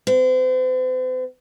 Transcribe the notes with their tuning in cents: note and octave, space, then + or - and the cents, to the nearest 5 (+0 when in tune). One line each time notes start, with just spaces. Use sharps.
C4 -40